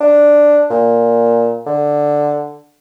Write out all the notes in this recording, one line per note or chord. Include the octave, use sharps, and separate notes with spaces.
D4
A#2
D3